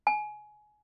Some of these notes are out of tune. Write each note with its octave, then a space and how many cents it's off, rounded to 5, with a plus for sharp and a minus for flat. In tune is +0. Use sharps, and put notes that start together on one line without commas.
G#5 +25